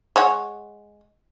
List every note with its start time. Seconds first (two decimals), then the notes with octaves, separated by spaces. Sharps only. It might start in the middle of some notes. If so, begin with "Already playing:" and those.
0.16 G#3 C#5 F#5